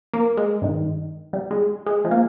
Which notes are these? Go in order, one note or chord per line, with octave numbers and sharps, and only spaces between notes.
A#3
G#3
G2 D#3
G3
G#3
G#3
F3 G#3
A#3